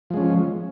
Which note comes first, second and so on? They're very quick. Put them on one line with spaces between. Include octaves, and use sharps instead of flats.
F3 G#3 C#4